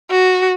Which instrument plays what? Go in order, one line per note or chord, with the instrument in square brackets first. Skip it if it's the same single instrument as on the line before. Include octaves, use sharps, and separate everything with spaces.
[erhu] F#4